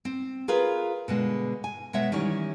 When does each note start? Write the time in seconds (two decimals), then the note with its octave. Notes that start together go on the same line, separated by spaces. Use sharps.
0.05 C4
0.48 F4 G#4 A#4 B4 F5
1.08 B2 D3 G#3
1.64 G#5
1.93 B2 G#3 C#5 E5 F#5
2.12 D#3 E3 G3 C#4 C#5